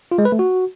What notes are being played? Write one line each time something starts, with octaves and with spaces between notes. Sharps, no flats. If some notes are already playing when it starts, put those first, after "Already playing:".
F4
G#3
B4
A3
F#4